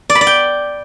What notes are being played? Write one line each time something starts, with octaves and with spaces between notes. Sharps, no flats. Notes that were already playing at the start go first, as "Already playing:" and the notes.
D5
B5
D5
G5